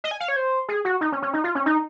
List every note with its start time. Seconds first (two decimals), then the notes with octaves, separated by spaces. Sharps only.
0.04 D#5
0.11 G#5
0.20 F5
0.28 C#5
0.36 C5
0.68 G#4
0.85 F#4
1.01 D#4
1.12 C#4
1.22 C#4
1.33 D#4
1.44 F4
1.55 C#4
1.66 D#4